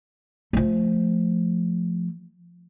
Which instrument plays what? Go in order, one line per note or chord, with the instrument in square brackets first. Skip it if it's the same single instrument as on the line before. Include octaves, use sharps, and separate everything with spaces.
[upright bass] F3 A3